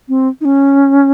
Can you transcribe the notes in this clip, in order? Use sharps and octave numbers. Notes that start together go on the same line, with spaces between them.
C4
D#4
C#4